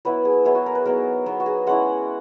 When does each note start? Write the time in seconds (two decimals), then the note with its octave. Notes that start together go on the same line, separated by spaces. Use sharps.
0.05 F#3 B3 E4 B4
0.25 G#4
0.45 F#3 B3 E4 G#4
0.55 F#4
0.66 A#4
0.75 B4
0.85 F#3 B3 D#4 A#4
1.26 F#3 B3 D#4
1.40 F#4
1.46 G#4
1.67 G#3 C#4 E4 F#5